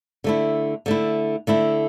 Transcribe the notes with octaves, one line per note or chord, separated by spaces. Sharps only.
D3 A3 E4
D3 A3 E4
D3 A3 E4